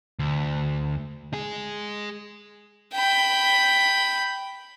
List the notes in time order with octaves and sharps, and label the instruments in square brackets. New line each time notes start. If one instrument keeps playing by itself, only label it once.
[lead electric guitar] D2
G#3 G#4
[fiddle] G5 B5